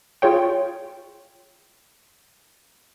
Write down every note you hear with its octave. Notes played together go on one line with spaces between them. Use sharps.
F4 G#4 C#5 G5